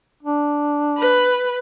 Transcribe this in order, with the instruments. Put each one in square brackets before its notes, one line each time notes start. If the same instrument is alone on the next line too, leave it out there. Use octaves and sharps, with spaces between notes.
[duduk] D4
[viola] B4